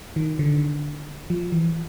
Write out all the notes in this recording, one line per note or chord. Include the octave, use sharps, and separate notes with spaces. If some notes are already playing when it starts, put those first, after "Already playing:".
D#3
D3
F3
E3